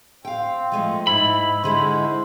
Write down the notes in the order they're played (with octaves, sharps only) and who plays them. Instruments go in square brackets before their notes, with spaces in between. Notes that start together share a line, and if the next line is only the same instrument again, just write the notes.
[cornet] C4 [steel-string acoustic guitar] F5 G5
[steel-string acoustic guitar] F3 G#3 A3
[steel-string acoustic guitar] G#2 [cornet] E4 [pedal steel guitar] B5
[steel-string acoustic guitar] D3 G#3 E4 [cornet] C5